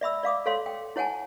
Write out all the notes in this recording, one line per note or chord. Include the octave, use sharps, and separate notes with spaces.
D5 E5 B5 E6
D5 F5 D6 D#6
A4 C#5 F5 C6
G5
E4 C#5 F#5 G#5 A5